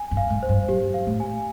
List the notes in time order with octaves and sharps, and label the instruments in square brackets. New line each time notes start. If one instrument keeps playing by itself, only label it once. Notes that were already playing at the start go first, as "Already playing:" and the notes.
Already playing: [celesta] G#5
[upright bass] G2
[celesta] F5
[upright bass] G#2
[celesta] C5
[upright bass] G2
[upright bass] F#2 [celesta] G4
[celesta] F5
[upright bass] A2
[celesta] G#5